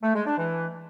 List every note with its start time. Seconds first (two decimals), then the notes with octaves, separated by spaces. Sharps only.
0.02 A3
0.14 G#3
0.26 D4
0.37 E3